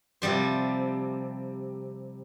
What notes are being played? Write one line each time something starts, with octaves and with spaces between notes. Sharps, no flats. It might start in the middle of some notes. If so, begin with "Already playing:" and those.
C3 F3 G3 C5